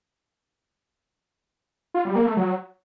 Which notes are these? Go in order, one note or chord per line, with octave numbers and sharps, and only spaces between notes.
F4
G3
A#3
A3
F#3